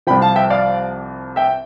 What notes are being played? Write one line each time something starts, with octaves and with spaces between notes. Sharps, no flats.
C2 C3 F3 G5 B5
F5 A5
E5 G5
D5 F5
E5 G5